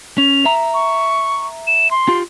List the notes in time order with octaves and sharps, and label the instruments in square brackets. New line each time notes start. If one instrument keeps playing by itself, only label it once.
[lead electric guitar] C#4 [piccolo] F7
[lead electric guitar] E5 A#5
[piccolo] C#6
E7
C6
[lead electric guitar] F4 G4